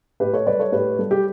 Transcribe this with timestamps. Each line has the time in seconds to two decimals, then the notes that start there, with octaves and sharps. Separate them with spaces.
0.20 A2 G4 B4
0.33 A4 C#5
0.47 G3 B4 D5
0.59 A4 C#5
0.72 A2 G4 B4
0.99 G3 A4
1.11 G4